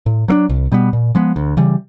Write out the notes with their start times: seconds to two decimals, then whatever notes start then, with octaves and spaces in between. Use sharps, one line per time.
0.06 A2
0.28 F#3 A#3 D4
0.49 C2
0.72 B2 G3 B3
0.93 A#2
1.15 F3 G#3 B3
1.36 D2
1.57 C#3 E3 G3